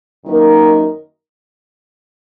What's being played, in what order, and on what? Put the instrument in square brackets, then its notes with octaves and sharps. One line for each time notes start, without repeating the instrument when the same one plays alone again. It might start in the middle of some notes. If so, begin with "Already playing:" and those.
[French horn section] F#2 D#3 A#3 D#4 A#4